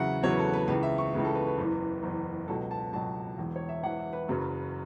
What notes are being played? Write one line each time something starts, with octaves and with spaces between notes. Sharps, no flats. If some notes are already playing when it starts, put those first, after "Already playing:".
Already playing: E2 C#3 F#3 E5 F#5
E2 C#3 F#3 C#5
B4
A4
B4
C#2 C#3 E3 B4
E5
C#6
C#2 C#3 E3 B4
A4
B4
B4
F#1 E2 E3
F#1 E2 E3
C#2 B2 F#3 A4
A5
C#2 B2 F#3 A5
E1 E2 E3
C#5
E5
E1 E2 E3 F#5
E5
B4
F#1 F#2 C#3 F#3